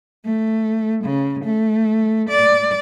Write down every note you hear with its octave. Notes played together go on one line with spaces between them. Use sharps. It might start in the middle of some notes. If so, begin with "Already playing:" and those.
A3
C#3
A3
D5